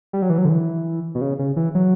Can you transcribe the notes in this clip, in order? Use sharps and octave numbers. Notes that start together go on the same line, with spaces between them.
G3
F#3
E3
F#3
D3
E3
B2
C#3
C#3
E3
F#3